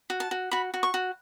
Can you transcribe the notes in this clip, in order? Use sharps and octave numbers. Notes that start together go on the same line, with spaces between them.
F#4
A5
F#4
F#4 B5
F#4
C#6
F#4